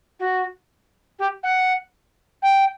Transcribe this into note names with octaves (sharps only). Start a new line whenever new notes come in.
F#4
G4
F#5
G5